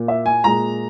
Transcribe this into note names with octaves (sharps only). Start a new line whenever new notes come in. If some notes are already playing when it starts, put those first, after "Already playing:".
Already playing: A#2 A#3
E5
G#5
A#2 G#3 A#5